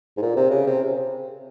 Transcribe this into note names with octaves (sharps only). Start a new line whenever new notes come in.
G#2
A#2
C3
C#3
C3